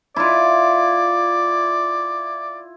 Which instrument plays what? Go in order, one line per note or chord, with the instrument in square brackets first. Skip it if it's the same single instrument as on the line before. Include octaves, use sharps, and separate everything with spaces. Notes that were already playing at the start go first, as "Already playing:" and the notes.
[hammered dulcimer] E4 F4 [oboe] D5